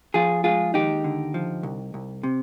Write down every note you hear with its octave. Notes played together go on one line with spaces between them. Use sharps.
F3 F4 G#4
G#3 F4 G#4
D#2 D#4 G4
D3
F3
C2
C2
C3